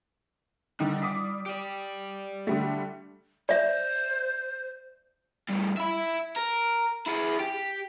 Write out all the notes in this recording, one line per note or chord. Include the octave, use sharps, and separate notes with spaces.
D3 D#3 G3 D#4
D6 D#6 B6
G4 D5
D3 G3 A3
C5 D5 E5
A2 G3
E5 B5
A#4
E4 G#4
G4